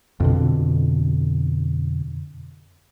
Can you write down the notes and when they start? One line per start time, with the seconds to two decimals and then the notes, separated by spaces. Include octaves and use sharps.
0.20 F2 B2 D3